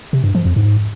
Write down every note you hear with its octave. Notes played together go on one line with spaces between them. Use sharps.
C3
G2
F3
F2
G#2